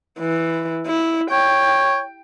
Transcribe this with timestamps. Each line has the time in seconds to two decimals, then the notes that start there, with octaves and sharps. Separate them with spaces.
0.19 E3
0.87 E4
1.31 C#5 G5